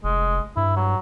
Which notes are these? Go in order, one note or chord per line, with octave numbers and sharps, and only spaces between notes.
F1 G#3
G2 E4
F#3